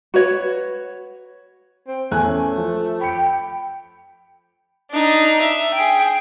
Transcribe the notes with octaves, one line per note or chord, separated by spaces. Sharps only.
F#4 B4 C#5
C4
E2 A3 G#5 F#6
C#4
F3
G5 B5 C#7
D4 D#4
E5
G#4 G5